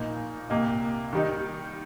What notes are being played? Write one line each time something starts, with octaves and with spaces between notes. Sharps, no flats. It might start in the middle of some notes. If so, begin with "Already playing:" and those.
Already playing: A#1 A#2 A#3 D#4 A#4
C2 A#2 A#3 G4 D#5
D#3 G3 D#4